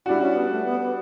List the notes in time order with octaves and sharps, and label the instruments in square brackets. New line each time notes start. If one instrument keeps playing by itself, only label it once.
[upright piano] G3 D4 F#4 [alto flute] E4
[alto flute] C#4
B3
A3
B3
B3